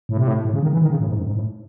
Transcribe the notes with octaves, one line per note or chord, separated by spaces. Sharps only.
A2
C3
A2
A2
C#3
D#3
E3
D#3
C#3
A2
G#2
F#2
G#2
A2